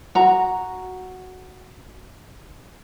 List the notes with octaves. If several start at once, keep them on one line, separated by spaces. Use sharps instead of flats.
F#4 A#5